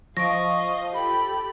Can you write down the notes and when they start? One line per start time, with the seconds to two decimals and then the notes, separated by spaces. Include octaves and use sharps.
0.17 F3 D#5 F5 C#6 A#6 D7
0.94 G4 A4 B5